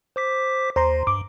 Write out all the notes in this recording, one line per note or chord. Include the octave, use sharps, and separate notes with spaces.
C5 D6 B6
D#2 C5 A#5 C6
G2 D6